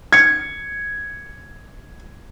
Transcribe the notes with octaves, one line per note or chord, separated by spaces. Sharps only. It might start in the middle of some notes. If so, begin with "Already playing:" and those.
G#6 C#7